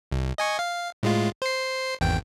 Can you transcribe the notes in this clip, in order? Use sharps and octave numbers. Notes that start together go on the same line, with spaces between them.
C2
D#5 G#5 C#6
F5
A2 G#3 F4
C5 C7
G#1 E2 G5